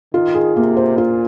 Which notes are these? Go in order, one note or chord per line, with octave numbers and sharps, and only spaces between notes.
D#3 F4
G#4
C3 A#3
C5
A#2 F4